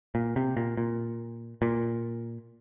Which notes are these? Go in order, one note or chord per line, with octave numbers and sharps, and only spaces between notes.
A#2
C3
A#2
A#2
A#2